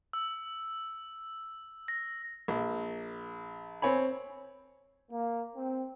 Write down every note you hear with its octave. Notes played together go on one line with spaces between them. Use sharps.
E6
A#6
A#1
C4 C#5 G#5 B5
A#3
C4